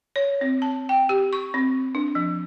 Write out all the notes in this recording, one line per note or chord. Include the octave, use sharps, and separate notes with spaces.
C#5
C4
A5
G5
G4
C#6
C4
D4
F3